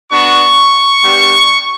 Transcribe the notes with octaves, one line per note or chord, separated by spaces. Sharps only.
B3 D4 F#4 C#6
G3 B3 D4 G4